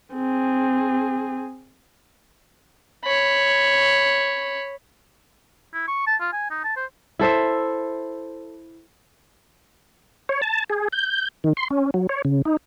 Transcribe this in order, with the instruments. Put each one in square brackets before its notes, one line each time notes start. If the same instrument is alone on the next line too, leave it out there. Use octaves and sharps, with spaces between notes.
[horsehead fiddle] C4 G#4
[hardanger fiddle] C#5 B5
[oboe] E4
C#6
A5
F4
G#5
D#4
A5
C5
[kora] E4 A4 C5 E5
[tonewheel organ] C#5
A5
G#4
G6
D#3
C6
C#4
F#3
C#5
C#3
D#4